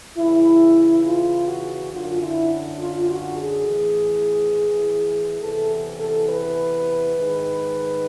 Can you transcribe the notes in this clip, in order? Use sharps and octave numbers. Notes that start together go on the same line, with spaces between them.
E2 C#3 E3 E4
F4
F#4
F#2 D3 F4
E4
F4
F#4
G#4
A2 E3
E2 C3 E3 A4
A4
B4
G#2 D#3